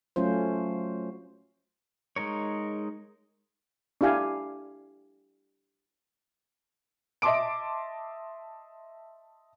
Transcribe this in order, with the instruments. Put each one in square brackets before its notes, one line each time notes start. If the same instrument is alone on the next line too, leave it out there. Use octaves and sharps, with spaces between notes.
[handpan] F#3 A3 C#4 F4 C5
[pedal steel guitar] G#3 D#4 A#4 C#5
[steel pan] D4 E4 G4 F5 G#5
[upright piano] D#5 E5 A5 C6 D6 D7